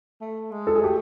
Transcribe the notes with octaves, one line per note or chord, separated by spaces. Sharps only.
A3
G#3
A4
G#4
A3 G4